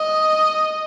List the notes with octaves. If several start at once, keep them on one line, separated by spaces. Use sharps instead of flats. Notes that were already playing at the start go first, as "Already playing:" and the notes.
Already playing: D#5